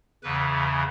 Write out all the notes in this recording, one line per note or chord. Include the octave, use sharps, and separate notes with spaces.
E2 C#3 E3 B4